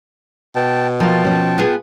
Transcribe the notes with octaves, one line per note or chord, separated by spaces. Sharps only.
B2 G5 A5
F3 A#3 F4 G5 A5
F3 C#4
B3 F4 G#4